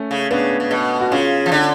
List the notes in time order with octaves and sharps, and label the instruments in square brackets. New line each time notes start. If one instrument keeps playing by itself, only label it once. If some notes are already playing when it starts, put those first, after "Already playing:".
Already playing: [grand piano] A3 C#4
[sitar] C#3
[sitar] C#3 [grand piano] B3 D4
[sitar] C#3
B2
[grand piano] F#4
[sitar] C#3 [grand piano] C#4 F4
[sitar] F3
D3